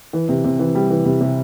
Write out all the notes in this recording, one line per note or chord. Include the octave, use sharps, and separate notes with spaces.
E3
C3
C3
E3
G3
E3
C3
C3